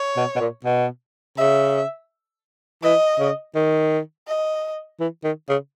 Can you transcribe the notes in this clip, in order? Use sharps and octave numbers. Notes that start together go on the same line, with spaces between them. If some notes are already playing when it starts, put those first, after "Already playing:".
Already playing: C#5
B2
B2
A#2
B2
C#3 E5
E3 D#5
C#3
D#3
D#5
E3
D#3
C#3